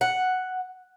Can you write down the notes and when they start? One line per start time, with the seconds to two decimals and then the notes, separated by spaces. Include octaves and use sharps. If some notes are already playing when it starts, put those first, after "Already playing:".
0.01 F#5